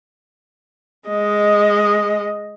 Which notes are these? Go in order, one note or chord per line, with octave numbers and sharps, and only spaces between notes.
G#3 D#5